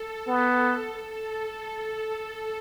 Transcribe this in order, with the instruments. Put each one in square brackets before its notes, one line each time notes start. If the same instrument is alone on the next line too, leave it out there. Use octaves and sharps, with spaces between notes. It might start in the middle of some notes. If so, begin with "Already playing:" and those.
Already playing: [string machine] A4
[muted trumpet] B3
[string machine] A4